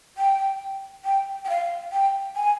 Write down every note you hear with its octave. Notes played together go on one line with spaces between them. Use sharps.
G5
G5
G5
F5
G5
G#5